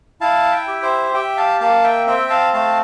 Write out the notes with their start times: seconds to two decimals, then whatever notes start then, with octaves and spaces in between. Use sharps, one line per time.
0.21 E4 F5 A5
0.52 E5 G5
0.67 G4
0.83 C5 E5
1.14 G4 E5 G5
1.37 F5 A5
1.60 A#3 F5 A5
1.84 E5 G5
2.07 C4 E5 G5
2.30 F5 A5
2.53 A3 F5 A5